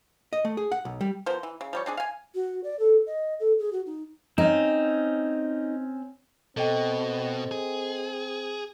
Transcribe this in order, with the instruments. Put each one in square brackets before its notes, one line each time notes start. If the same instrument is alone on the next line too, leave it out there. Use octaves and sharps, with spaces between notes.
[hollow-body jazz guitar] D#5
A3
G#4
F#5
B1
G3
[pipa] F3 B3 A#4 C5
E3
C#3
F3 G3 C#5
C4 D4 G#4
F5 G#5
[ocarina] F#4
D5
A4
D#5
A4
G#4
F#4
D#4
[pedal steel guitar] C4 C#4 [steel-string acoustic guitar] D#4
[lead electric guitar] B2 [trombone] C4 [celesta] A4 D#5 G5
[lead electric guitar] G#4